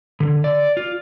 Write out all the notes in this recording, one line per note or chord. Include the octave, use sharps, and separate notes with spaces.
D3
D5
F4